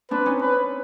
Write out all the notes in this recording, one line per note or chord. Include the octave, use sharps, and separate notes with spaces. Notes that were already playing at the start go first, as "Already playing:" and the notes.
C4 D4 B4
C#4 D#4
B4